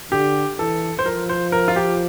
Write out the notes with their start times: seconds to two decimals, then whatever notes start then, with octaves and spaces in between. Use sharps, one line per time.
0.12 D3 G4
0.59 E3 A4
0.99 C5
1.06 F3 A#4
1.29 C5
1.52 A#4
1.68 F4
1.76 G4